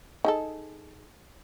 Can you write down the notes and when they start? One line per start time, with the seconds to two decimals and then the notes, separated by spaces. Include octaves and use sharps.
0.25 D#4 G#4 A4